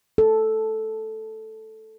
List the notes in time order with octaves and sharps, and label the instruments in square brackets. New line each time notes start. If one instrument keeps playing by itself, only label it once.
[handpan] A4